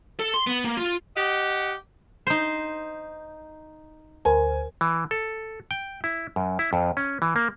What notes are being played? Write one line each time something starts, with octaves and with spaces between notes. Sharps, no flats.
A4
C6
B3
A#3
F4
G4 D#5 F#5
D#4 C5
D2 A#4 C5 G#5
E3
A4
G5
E4
F#2
E4
F2
C#4
E3
A#3